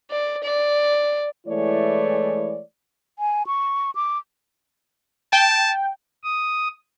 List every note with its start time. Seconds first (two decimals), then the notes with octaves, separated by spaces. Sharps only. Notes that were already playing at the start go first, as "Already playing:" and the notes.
0.11 D5
0.43 D5
1.47 E3 G#3 A3 E4 C#5 D5
3.19 G#5
3.47 C#6
3.95 D6
5.33 G5 A5
6.24 D#6